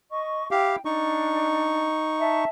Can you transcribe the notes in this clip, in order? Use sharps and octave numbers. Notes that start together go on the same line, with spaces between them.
D#5 C#6
E4 G4 F5 G5
D4 D#4 C#6
E5 A5